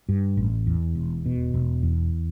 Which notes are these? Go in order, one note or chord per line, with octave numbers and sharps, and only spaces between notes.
G2
A1
E2
E1
B2
E1
E2